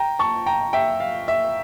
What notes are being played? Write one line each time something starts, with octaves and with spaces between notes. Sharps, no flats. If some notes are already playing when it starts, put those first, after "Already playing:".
Already playing: G5 A#5
A5 C#6
G5 A#5
E5 G5
F5
E5